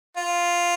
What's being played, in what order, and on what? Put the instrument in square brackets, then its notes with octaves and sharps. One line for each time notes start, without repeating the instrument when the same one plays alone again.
[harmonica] F4